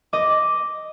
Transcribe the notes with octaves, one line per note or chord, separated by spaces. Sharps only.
D#5 D6